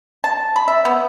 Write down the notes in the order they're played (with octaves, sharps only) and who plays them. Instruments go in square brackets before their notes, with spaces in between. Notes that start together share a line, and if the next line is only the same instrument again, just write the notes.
[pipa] A5
B5
E5
B3